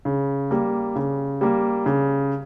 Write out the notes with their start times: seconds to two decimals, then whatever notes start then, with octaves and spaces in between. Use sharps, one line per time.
0.05 C#3
0.51 G3 A#3
0.96 C#3
1.41 G3 A#3
1.86 C#3